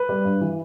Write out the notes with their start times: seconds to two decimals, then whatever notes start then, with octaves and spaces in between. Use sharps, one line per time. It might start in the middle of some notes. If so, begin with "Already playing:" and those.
Already playing: B4
0.09 G3
0.25 G2
0.41 E3